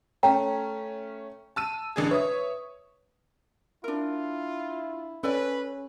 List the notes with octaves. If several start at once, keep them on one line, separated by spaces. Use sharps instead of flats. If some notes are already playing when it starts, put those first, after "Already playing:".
A3 C#4 C#5 G5 A#5
A5 E6 D#7
A1 D4 G#4
B4 C#5 E5 D#6
D4 E4 F4 A#4
C#4 A4 B4 D5 G#5